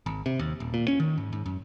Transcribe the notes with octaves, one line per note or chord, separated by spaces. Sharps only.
G#1
C3
D#2
D#1
A#2
C#4
D#3
G#2
G#2
F#2